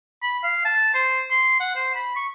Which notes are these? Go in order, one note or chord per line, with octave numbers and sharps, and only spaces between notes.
B5
F5
A5
C5
C6
F#5
C5
B5
C#6